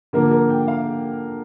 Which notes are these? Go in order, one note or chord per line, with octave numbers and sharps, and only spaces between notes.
D3 F3 A#3 A#4
A#4
G5
F5